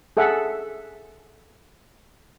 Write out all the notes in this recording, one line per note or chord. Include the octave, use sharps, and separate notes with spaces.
G#4 A4 E5 F#5